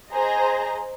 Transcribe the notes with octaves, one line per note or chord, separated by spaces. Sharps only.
G#4 C5 D#5 A#5